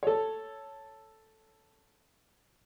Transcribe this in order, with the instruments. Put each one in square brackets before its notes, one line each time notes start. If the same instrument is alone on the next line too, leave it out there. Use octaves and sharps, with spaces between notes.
[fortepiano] A4 C#5